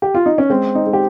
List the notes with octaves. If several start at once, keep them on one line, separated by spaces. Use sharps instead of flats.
G4
F4
D#4
C#4
G#3 C4
D#4
G#3
G4